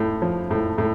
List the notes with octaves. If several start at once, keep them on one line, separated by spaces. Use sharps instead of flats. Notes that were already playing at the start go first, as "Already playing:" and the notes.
Already playing: A2
F3
A2
A2